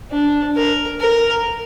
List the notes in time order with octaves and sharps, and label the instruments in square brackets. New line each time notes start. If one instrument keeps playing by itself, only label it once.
[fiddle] D4
A#4
A#4